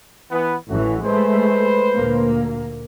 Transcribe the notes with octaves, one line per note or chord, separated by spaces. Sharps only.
E3 B3
A1 E3 A3 C#4 F#4
G#3 A3 B4 C5
D2 A#2 A#3